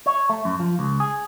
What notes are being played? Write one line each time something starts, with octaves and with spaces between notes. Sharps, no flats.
C#5
A3
F#2
F3
C#2
G#4